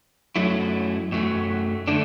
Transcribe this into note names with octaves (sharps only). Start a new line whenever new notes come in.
F#2 F#3 A3 E4
F#2 F#3 A3
D3 A3 D4